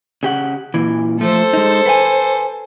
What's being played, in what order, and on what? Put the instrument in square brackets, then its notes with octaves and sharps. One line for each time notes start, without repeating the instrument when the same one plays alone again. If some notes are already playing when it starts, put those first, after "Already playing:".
[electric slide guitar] C#3 G4 F#5
A#2 E3
[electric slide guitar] F3 A3 [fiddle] A4 C5
[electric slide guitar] G#3 D#4
B4 G5 G#5